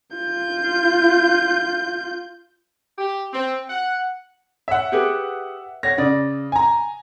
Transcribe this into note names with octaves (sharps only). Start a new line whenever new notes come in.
F4 G6
G4
C4
F#5
C#5 E5 F#5
G4 G#4 B4
C#5 F#5 A#6
C#3 D5
G#5 A#5